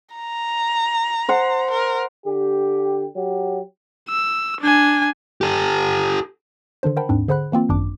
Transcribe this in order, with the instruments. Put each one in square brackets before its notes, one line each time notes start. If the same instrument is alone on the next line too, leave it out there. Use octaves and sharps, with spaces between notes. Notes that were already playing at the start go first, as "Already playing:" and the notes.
[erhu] A#5
[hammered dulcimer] C5 F#5
[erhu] A#4
[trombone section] D3 G4
F#3 G4
[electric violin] E6
D4 G#5
[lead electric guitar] G4 A4
[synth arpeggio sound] D3 D#3 D4 C5
A#4 C5 F#5 G5 A5 B5
D#2 G#2 C4 D4
D3 G#4 C5 F#5 B5 F#6
E3 A#3 C4 F4
G#1 F#2 D4 D6